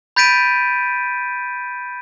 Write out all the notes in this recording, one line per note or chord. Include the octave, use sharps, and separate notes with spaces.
B5 G6 A6 B6 D7 D#7